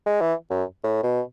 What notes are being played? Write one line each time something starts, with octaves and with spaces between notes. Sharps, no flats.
G#3
E3
F#2
A2
B2